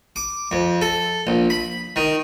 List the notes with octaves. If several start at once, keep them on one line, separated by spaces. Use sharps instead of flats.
D6
F2
A4
A#1
B5
D#3